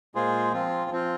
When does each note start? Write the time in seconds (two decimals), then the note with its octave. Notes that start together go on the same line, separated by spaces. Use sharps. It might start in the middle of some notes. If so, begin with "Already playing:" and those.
0.15 A#2 G#3 F4 G#4 C5
0.53 F3 C4 F4
0.90 F3 C4 F4